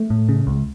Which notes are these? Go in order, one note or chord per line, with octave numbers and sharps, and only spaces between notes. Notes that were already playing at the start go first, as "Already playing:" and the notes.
Already playing: A3
A2
C#3
C#2